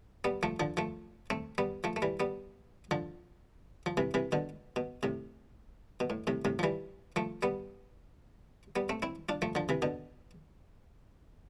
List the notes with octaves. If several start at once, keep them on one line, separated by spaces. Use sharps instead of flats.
G3 B3
F3 A3
D3 F3
F3 A3
A3 C4
G3 B3
F3 A3
A3
E3 G3
G3 B3
D3 F3
F3
C3 E3
C3 E3
B2 D3
B2
A2 C3
B2
A2
A2 C3
A2 C3
F3
E3 G3
F3 A3
G3 B3
G3 B3
A3 C4
C4 E4
D4 F4
F3 A3
D3 F3
C3 E3
B2 D3